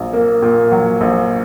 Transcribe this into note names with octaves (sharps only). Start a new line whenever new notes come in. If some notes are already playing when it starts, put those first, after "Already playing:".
Already playing: A#1 F#3
A#3
A#2
F#3
A#1